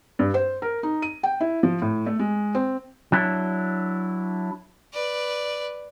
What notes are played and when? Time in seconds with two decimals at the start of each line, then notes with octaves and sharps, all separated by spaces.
0.19 G2
0.34 C5
0.62 A#4
0.83 D#4
1.02 D#7
1.23 G5
1.41 E4
1.63 F3
1.82 A2
2.06 A3
2.19 G#3
2.55 C4
3.12 F#3 D4 E4
4.93 B4 D5